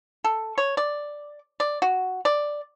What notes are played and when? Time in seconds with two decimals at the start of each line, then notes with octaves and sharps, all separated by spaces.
0.24 A4
0.58 C#5
0.77 D5
1.60 D5
1.82 F#4
2.25 D5